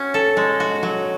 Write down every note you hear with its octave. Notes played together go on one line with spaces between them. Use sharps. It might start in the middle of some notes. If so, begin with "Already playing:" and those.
Already playing: C#4 F#4
A4
G#3
F#4
F#3